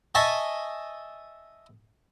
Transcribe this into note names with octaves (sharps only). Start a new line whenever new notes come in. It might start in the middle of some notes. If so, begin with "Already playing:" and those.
D#5 E5 G#5 A5 C#6